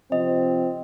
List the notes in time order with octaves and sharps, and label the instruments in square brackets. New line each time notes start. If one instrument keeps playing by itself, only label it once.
[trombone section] C3 F3 C4 [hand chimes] D#5